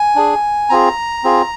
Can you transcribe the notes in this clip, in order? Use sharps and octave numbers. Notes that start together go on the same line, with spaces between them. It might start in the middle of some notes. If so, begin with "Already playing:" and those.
Already playing: G#5
D4 G#4
C4 F4 G#4 A#5
C4 F4 G#4